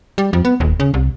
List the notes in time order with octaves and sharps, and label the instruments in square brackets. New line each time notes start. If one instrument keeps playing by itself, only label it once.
[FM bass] G3
F2
B3
D#1
C#3
C2